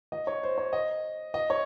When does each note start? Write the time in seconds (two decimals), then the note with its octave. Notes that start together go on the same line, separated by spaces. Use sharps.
0.12 D#5
0.27 C#5
0.43 C5
0.58 C#5
0.73 D#5
1.34 D#5
1.50 C#5